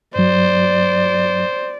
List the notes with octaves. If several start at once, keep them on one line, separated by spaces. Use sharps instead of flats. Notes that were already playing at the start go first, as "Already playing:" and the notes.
G2 F#3 C5 D5